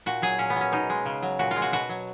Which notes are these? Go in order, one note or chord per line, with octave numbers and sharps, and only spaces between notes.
A#2 F#4
F#3 G#4
A#2 C#4
B3
F#3 C#4
B2 D#4
G#3
C#3
F#3
A#2 F#4
F4
G#3
F#4
B2 F#4
F#3